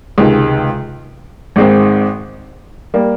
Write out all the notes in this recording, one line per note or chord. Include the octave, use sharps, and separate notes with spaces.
C#2 C3 D#3 G#3
G#1 G#2 D#3 G#3 C4
G3 A#3